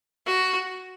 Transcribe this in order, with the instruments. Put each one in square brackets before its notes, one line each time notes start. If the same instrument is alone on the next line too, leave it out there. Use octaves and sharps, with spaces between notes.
[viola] F#4